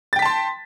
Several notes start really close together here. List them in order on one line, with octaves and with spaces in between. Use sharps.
A6 G5 B6 A5 C6